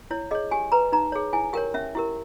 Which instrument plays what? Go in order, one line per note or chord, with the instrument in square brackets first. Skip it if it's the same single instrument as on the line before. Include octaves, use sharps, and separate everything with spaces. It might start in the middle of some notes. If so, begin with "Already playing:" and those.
[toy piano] E4 C#5
G#4 C#5 D#5
G4 G#5
B4 A#5
D#4 A#5
G#4 C#5
E4 G#5
G4 A#4 C#5 G5
C#4 E5
E4 G4 A#4